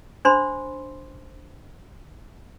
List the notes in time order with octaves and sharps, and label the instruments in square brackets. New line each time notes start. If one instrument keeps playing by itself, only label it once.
[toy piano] D4 C5 B5 C6